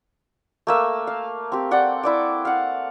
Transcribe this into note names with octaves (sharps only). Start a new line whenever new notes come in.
A3 A#3 E5
F5
C4 G4
D5 F#5 G5
E4 D5 D6
F5 F#5